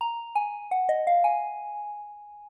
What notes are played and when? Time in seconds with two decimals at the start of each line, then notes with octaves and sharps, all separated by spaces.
0.01 A#5
0.35 G#5
0.71 F#5
0.89 D#5
1.07 F5
1.24 G#5